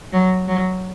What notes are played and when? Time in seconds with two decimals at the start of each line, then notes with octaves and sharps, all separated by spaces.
0.13 F#3
0.48 F#3